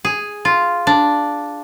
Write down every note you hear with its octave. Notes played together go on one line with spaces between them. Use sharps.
G#4
F4
D4